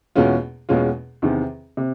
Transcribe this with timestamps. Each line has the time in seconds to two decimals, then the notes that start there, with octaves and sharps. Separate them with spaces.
0.15 E2 B2 G#3 C#4 F4
0.69 E2 B2 G#3 C#4 F4
1.22 E2 C3 D#3
1.77 C3